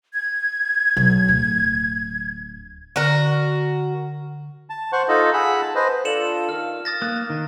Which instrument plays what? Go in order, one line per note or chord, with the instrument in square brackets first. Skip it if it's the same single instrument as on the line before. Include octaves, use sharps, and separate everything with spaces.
[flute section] G#6
[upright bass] B1
D1
[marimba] D3 [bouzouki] F#4 A#4
[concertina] A5
C5 F#5 C#6
D#4 F4 A4 D#5
G#4 F#5 B5 E6
A5
B4 C5 D#5
[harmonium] D4 F4 A4 [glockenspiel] C#7 E7 F#7
[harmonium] D#3 F5 [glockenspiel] F6
[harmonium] F5 [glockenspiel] D#6 A6 A#6
[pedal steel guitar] A#3 F#6 [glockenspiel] D#6
[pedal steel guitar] D#3